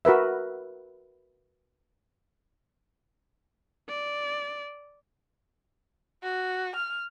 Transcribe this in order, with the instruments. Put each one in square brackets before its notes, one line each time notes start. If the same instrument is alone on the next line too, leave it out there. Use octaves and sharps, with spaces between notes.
[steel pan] F#4 A#4 B4 E5
[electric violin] D5
[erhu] F#4
F6